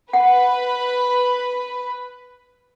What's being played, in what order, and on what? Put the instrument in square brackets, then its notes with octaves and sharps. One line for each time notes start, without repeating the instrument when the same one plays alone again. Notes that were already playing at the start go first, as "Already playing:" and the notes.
[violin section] B4 [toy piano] F#5